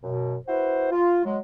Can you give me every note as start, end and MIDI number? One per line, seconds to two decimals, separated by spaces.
0.03 0.36 42
0.03 0.36 47
0.47 0.88 64
0.47 0.88 66
0.47 0.88 71
0.47 0.88 72
0.92 1.22 65
1.25 1.38 54
1.25 1.38 56